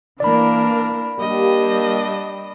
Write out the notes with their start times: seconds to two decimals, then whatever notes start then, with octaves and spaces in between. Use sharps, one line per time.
0.20 E3 A#3 D4 A#4 D5 B5
1.20 G3 A#3 D4 G4 D#5